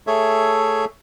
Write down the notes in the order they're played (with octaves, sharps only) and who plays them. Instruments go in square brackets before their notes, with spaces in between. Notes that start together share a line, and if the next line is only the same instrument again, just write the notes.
[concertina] A3 G#4 A4 C#5 E5